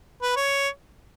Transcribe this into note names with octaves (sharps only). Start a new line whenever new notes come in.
B4
C#5